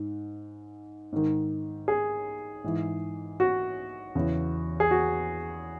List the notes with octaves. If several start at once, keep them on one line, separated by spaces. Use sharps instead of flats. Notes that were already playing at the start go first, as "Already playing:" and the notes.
Already playing: G#2
G#2 D#3
G#4
G#2 E3
F#4
E2 C#3 E3
G#4
F#4